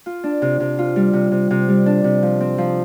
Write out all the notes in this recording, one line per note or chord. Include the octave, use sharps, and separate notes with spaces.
F4
D4
C3
C3
F4
G3
C3
C3
C3
G3
D4
C3
F3
C4
F3